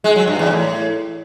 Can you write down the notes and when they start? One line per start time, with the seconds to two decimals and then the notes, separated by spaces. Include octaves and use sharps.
0.04 G#3
0.16 F#3
0.27 G2
0.39 E2
0.51 A2